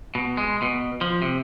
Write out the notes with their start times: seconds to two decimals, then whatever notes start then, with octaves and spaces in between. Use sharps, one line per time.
0.15 B2
0.37 G#3
0.62 B2
1.01 F3
1.22 C3